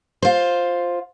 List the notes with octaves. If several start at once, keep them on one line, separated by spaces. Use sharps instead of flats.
F4 C5